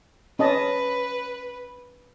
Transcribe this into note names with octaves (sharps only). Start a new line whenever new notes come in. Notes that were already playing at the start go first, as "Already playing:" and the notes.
C#4 B4 D#5 A5